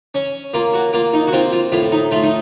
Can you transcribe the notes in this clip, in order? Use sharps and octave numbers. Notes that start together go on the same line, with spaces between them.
C#4
A#3 F4
F#4
A#3 F4
D#4
F#4
C4 F4
F4
A2 F4
D#4
A3 F4
D#4